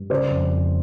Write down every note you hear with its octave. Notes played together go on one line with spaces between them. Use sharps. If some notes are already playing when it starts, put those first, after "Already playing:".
Already playing: G2
C#3 C5 D5
F2
F2